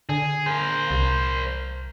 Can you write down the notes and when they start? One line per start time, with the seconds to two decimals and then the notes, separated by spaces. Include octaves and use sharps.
0.09 D3 G#4
0.46 A#4 C5
0.91 C2